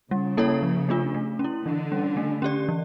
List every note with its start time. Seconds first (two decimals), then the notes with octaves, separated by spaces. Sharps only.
0.11 C#3 G3
0.37 A#3 E4 A4 C#5
0.62 F3
0.89 A3 D4 F4
1.14 A3
1.39 C#4
1.44 E4
1.65 D3 E3
1.92 G3 C#4
2.17 A3
2.42 C#4 G4 D5
2.68 E3